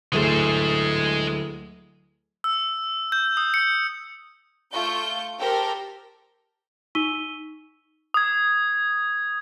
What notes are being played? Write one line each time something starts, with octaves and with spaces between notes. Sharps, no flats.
D1 G#3 A3 G#4 C5
E6
G6
D#6
C#7
A3 F4 C#6 G6
G4 A4 A#4 C5 G5
D#4 C#6 E6 B6 D#7 G7
D#6 G#6